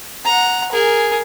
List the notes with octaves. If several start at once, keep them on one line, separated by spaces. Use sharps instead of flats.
F#5 A#5
G#4 A#4